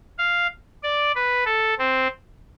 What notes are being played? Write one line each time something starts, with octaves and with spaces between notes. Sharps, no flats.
F5
D5
B4
A4
C4